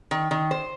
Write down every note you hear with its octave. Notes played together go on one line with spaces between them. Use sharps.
D#3
D#3
C5